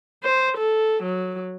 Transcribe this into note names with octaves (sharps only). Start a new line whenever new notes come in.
C5
A4
F#3